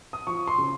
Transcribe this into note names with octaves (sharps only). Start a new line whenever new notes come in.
D#6
F3 C#6
C6
C#3